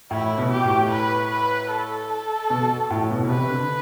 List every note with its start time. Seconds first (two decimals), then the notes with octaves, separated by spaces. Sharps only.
0.11 A2 E4
0.38 B2
0.50 G4
0.64 A2
0.91 B4
1.31 B4
1.70 A4
2.50 B2
2.90 A2
3.11 B2
3.24 B2
3.30 C3 B4
3.50 D3